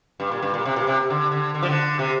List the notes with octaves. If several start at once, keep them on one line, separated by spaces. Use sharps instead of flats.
G2
A#2
G2
A#2
C3
A#2
C3
D3
D3
D3
F3
D3
C3